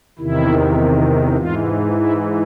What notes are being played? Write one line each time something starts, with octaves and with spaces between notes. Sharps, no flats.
E2 C3 D#3 E4
G#2 E3 F4
E4